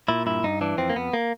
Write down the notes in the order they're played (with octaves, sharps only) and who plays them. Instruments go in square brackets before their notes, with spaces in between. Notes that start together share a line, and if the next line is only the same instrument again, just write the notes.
[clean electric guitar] A#2 E4
G2 E4
G2 D#4
E3 D4
F2 C4
A#3
F2 B3
A#3